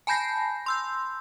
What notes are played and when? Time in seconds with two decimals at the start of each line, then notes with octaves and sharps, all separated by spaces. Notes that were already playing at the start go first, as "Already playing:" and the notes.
0.07 G#5 A5 B5 G6 A#6 C7
0.66 C6 E6 G6